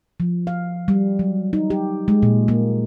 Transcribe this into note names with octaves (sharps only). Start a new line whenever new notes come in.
F3
F5
G3
F#3
D#4
G4
G#3
A#2
A#3